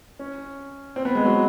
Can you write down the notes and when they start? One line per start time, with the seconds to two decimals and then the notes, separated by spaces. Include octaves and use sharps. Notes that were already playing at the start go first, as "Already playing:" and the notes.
0.19 C#4
0.96 C4
1.05 B3
1.15 G#3
1.25 F#3